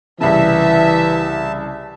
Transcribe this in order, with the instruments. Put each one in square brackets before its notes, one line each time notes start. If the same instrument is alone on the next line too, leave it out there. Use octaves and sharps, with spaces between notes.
[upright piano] C2 C#3 [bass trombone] E3 [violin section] E5 [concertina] A5